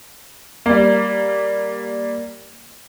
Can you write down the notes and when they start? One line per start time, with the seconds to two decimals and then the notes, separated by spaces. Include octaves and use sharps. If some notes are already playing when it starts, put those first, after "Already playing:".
0.66 G3 A#3